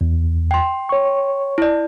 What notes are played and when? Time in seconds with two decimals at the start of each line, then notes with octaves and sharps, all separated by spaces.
0.01 E2
0.51 G5 C6
0.89 C#5 C#6
1.58 E4 D5